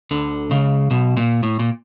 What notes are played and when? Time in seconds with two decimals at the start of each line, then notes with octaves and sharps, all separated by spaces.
0.11 D2 D3
0.51 C#2 C#3
0.91 B1 B2
1.17 A#2
1.43 A2
1.59 A#2